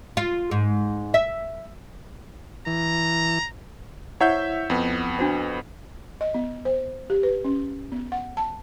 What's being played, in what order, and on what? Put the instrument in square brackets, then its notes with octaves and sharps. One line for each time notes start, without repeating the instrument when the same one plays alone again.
[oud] F4
G#2
E5
[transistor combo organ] E3 [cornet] A#5
[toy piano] E4 C5 F#5 [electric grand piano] C#5 E5 G6
[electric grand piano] F2 B3
[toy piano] D4 F#4 C5
[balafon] D#5
B3
C5
G4
B4
C#4
B3
F#5
A5